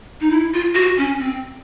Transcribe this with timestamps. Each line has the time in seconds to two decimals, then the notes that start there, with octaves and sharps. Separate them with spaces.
0.21 D#4
0.31 E4
0.54 F4
0.75 F#4
0.98 C#4
1.19 C4